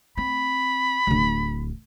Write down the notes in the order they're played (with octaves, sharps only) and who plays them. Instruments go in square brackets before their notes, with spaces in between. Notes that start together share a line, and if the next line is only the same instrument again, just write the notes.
[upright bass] C4 [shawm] B5
[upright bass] D1 D3